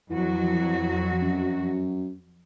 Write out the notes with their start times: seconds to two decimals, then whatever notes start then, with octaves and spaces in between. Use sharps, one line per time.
0.10 F2 E3 F#3 F#4
1.22 F#2